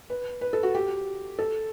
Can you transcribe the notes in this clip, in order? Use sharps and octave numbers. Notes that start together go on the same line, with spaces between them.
B4
B4
A4
F#4
G4
A4